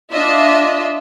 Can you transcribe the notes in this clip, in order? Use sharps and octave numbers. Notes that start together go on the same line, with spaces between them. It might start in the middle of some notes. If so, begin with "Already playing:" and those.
D4 F4 D#5 E5